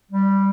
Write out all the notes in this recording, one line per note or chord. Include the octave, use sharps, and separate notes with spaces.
G3